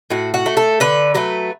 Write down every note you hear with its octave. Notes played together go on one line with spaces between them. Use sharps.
A2 F#4
F#4
A3
A4
D3 B4
F#3 A3 B4